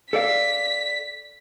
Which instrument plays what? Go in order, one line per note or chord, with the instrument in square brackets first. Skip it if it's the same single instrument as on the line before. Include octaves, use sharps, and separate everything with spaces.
[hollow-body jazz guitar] A4 D5 F5 [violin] B6